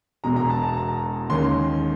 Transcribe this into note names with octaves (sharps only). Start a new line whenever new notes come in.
E1 E2 B2 G#3 A#5
A#5
A5
A5
A#5
D#2 D#3 G#3 C#4 C6